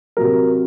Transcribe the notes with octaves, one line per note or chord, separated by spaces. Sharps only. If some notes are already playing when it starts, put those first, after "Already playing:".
C3 F#3 A#4